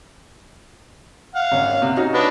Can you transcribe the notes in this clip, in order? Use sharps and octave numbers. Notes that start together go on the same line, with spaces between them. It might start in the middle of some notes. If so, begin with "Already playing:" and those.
F5 F#5
G#1 C#4
C3
C#4 D#4 F#4
D4 B4 D#5